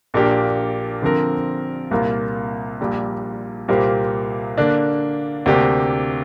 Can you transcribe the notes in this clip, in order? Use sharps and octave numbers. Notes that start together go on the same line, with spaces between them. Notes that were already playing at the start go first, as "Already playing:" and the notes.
A#1 A#2 A#3 D4 G4
D3 F3 C4 A#4
C2 A#2 A#3 F4
A#1 A#2 G3
C2 A#2 A#3 G4 C5
D3 A#3 D4
D2 C3 A#3 D4 G4